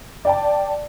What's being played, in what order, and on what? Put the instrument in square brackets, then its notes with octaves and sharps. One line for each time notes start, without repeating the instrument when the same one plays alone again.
[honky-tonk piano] D5 G5 A5